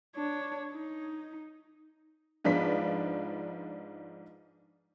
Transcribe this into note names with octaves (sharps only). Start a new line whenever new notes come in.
D4 C#5
D#4
G#2 F3 D4 B4 B6